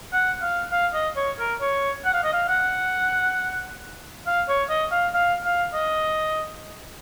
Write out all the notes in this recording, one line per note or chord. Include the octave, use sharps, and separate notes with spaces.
F#5
F5
F5
D#5
C#5
A#4
C#5
F#5
F5
D#5
F5
F#5
F5
C#5
D#5
F5
F5
F5
D#5